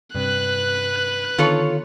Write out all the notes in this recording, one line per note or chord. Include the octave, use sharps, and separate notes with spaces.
G2 C3 B4 F#6
D3 D#3 B3 F4 A4 C#5